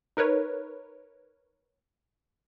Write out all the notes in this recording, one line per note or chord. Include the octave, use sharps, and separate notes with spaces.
D#4 A#4 B4 C#5